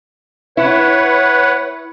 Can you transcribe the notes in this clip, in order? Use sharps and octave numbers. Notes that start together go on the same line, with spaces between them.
E4 B4 C#5 F#5